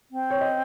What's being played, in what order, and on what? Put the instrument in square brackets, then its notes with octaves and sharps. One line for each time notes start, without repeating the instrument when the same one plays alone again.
[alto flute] C4
[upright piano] C#5
D#5